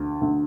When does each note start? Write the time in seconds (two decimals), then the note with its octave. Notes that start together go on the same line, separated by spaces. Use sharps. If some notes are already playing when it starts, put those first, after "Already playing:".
Already playing: D2
0.21 D2